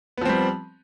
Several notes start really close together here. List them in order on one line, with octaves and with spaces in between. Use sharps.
B3 F3 C4 G3